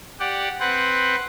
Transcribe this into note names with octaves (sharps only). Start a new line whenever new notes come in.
G4 D5 F#5
C4 B4 C5 F#5